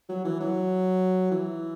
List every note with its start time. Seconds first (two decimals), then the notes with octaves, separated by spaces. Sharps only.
0.09 F#3
0.25 E3
0.40 F#3
1.31 E3